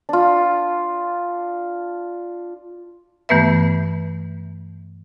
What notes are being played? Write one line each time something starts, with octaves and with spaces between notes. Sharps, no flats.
D4 F4
G2 E3 A3 B3 B4 E5